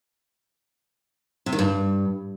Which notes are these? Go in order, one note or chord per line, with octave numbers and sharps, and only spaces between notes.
C3
D#3
G2